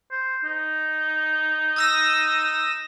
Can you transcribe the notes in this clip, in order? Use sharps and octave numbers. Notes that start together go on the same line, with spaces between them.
C5
D#4
D#6 E6 A#6